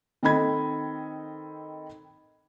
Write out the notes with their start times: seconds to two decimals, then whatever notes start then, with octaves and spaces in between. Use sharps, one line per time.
0.23 D#3 C4 A4 D#5 B5 G#6